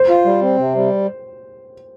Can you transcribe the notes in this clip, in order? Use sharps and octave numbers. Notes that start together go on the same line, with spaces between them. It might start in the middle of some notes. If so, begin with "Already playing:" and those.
Already playing: C5
F4
G3
C4
C3
G3